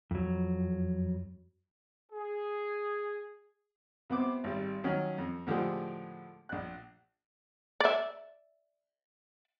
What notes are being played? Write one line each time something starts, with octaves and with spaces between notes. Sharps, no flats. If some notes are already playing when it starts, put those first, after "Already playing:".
F2 F#3
G#4
C3 B3 C4 D6
G#1 G3
D#3 F#3 C#4
F2
A2 D3 F3 G#3 G4 G#4
A#1 F#6
D5 E5